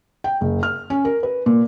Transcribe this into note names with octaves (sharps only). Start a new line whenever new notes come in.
G5
F#1
F6
C#4
A#4
B4
A#2